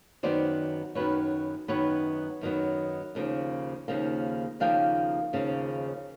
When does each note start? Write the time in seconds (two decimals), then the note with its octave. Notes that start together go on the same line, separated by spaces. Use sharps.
0.23 F#2 D#3 F#3 B3 C5 D5
0.95 F#2 D#3 F#3 B3 B4 C#5
1.68 F#2 D#3 F#3 B3 B4 C#5
2.41 F#2 D#3 F#3 B3
3.15 D#2 C#3 F3 A#3
3.88 D#2 C#3 F3 A#3
4.60 D#2 C#3 F3 A#3 F5 G5
5.33 D#2 C#3 F3 A#3